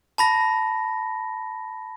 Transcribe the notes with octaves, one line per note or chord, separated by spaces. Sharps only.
A5 B5 A#6